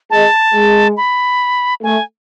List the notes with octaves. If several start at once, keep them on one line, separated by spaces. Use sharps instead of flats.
G#3 A5
G#3
B5
A3 G#5